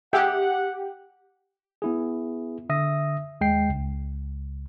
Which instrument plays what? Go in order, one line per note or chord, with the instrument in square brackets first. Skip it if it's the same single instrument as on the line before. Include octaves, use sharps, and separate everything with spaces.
[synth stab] G4 [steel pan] G#4 E5 G5 [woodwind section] F#5
[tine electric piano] B3 E4 G#4
D3 E5 D#6 A#6
D#2 G#3 G5 C7
C#2